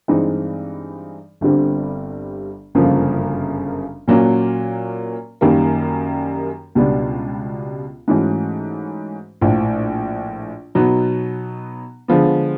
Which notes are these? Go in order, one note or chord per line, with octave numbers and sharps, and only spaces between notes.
G2 E3 G#3 C4 D#4
G1 G2 D3 G3 C4
G1 F#2 C#3 F3 A#3
A#2 F#3 A#3 C#4
F#2 D#3 G3 A#3
C#2 B2 G3 B3 D4
G#2 E3 A3 C#4 F#4
A#1 A2 F3
B2 F#3 B3 D#4
D3 F3 G#3 B3